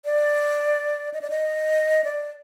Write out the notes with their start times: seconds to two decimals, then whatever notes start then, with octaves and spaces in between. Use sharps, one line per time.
0.05 D5
1.14 D#5
1.21 D5
1.30 D#5
2.04 D5